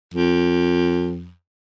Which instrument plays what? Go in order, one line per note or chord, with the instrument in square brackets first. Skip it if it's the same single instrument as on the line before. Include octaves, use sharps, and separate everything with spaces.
[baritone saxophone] F2